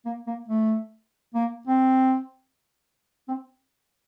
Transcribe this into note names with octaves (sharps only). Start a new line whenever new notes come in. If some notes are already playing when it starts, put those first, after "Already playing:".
A#3
A#3
A3
A#3
C4
C4